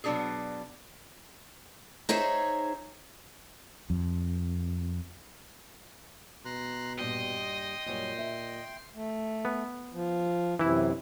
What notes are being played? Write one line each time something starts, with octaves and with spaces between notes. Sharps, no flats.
B2 F#3 B3 D4 G4 G#4
D#4 G#4 C5 C#5 E5
F2
B2 A#5 C6 F#6
G2 A#2 G4 D#5 G5 C6
F#2 A#2 G3 C#5
E5
A3
B3
F3
F#2 C3 E3 E4